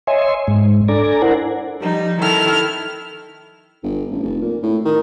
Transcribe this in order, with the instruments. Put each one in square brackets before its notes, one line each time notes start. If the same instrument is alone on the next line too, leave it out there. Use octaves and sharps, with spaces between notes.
[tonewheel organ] C#5 D#5 E5 G#5 C6
G#2 G#3
D4 A4 D5 G#5 A#5
E4 A#4 C5 F#5
[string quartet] F3 G3 D#4
D#3 E4 A4 F6
[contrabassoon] G1
A1
F1
A#2
A2
D#3